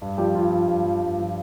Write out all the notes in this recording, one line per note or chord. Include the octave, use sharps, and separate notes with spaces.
G2
F3 G3 G4
G2 F3 F4
F3
G2
F3
G2
F3